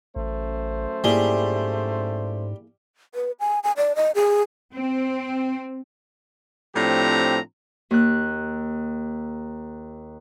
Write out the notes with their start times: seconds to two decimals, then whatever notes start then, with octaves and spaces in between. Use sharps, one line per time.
0.16 A1 F#2 A3 C5
1.04 G#2 G3 A#3 E4 G#4
3.15 B4
3.40 G#5
3.64 G#5
3.77 D5
3.96 D#5
4.15 G#4
4.75 C4
6.75 A2 F3 C4 D4 G4 A#5
7.91 D#2 F#6